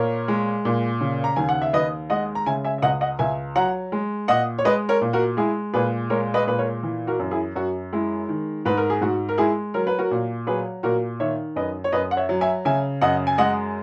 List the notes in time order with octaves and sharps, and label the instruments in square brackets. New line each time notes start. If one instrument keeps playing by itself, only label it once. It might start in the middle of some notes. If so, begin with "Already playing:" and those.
Already playing: [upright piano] A#2 A#4 C#5
G#3
A#2
C#3
A#5
D#2 G#5
F#5
E5
D#2 B4 D#5
G#3 D#5 F#5
A#5
C#3 E5 G#5
E5 G#5
E5
C#2 D#5 F#5
D#5 F#5
C#2 E5 G#5
F#3 F#5 A#5
G#3
A#2 D#5 F#5
C#5
G#3 B4 D#5
A#4 C#5
A#2
F#4 A#4
G#3 E4 G#4
A#2 G#4 B4
G#3 A#4 C#5
B4 D#5
A#2 B4
A#4 C#5
E3
F#4 A#4
F#2
E4 G#4
F#2 F#4
G#3 E4
D#3
G#2 B4
A#4
G#4
G#2 F#4
A#4
G#3 E4 G#4
F#3 A#4
B4
F#4 A#4
A#2
F#3 G#4 B4
A#2 F#4 A#4
D#3 C#5 E5
F#2 B4 D#5
C#5
F#2 B4 D#5
F#5
C#5 E5
F#3
E5 G#5
C#3 E5 G#5
F#2 D#5 F#5
G#5
G#3 D#5 F#5